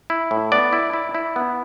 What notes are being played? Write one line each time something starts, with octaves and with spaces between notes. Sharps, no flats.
E4
A2
B3 D5
E4
E4
E4
B3